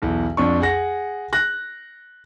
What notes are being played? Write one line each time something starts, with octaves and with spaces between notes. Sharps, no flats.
B1 E2
F2 D4 C#6
G#4 F#5 A#6
F#6 A#6